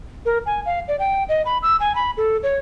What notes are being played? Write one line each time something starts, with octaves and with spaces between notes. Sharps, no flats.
A#4
G#5
F5
D5
G5
D#5
B5
E6
G#5
B5
A4
C#5